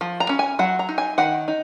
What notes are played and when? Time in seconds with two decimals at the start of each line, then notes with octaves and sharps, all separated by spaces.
0.01 F3
0.20 A#5
0.29 C#4
0.39 G#5
0.59 F#3 F#5
0.79 A#5
0.89 D#4
0.98 G#5
1.18 D#3 F#5
1.48 D#4